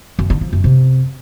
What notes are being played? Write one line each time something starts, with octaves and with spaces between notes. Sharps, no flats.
F#2
D3
F3
F#2
C3